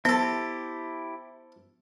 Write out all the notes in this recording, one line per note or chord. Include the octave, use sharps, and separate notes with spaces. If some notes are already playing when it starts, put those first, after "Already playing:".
B3 E4 G4 A4 C5